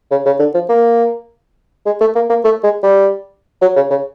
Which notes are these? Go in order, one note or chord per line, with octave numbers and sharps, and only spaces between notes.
C#3
C#3
D3
F3
A#3
G#3
A3
A#3
A#3
A3
G#3
G3
F#3
C#3
C#3